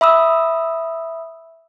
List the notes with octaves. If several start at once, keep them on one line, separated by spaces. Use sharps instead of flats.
E5 B5 D#6 E6